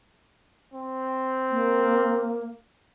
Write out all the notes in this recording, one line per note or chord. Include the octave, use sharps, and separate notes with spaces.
C4
A#3